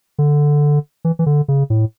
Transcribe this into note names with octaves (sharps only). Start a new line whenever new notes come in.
D3
E3
E3
D3
C#3
A2